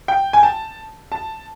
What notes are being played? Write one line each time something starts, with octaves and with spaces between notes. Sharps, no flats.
G5
G#5
A5
A5